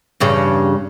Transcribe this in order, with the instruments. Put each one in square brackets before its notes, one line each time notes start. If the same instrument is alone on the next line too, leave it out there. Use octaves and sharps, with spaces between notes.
[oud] E2 G2 C#3